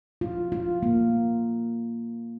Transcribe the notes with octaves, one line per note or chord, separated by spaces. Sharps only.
F4
F4
A#3